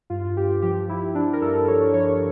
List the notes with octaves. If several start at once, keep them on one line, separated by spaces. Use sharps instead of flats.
G2 F4
G2 G4
F3 G4
F3 E4
F3 D4
A#4
G2 A4
F3 C#5
F3 C#5